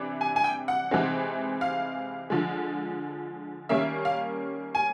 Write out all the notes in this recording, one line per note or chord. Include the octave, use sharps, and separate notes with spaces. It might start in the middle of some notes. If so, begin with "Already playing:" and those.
Already playing: C3 E3 D4
G#5
G#5
G5
F#5
C3 E3 G#3 C4 D#4
F5
D3 F3 G#3
D#3 G3 A#3 C#4 E5
F5
G#5